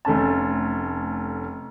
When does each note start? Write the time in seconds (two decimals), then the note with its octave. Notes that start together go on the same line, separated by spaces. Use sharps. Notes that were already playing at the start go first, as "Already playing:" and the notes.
0.05 F1 A3 C#4 A5